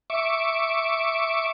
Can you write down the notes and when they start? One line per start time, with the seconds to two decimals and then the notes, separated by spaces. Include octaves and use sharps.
0.10 E5 C#6 D6